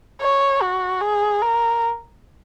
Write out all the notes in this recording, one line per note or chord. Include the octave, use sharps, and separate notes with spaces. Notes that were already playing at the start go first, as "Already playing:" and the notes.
C#5
F#4
G#4
A#4